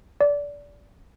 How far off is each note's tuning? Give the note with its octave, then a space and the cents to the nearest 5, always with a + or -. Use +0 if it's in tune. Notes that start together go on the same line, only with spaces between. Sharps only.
D5 -20